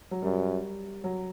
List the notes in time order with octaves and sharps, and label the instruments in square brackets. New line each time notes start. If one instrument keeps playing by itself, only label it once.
[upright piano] F#3
[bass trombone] F#2 [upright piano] G3
[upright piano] F#3